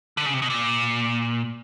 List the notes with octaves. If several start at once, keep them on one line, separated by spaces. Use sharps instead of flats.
D3
C#3
C3
B2
A#2